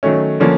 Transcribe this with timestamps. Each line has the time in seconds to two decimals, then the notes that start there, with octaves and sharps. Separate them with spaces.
0.03 D#3 F#3 A3 C#4
0.40 D3 F3 A#3 C#4